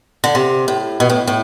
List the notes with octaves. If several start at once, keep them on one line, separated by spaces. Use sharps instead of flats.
D3
C3
A2
B2
A2
A2